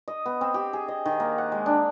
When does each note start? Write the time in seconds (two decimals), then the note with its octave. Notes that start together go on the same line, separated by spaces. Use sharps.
0.08 D#5
0.26 B3
0.41 C4
0.54 G4
0.73 G#4
0.88 D#5
1.06 D#3
1.20 A#3
1.38 F#5
1.52 G#3
1.66 D4